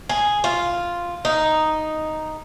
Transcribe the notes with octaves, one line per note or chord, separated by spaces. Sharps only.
G#4
F4
D#4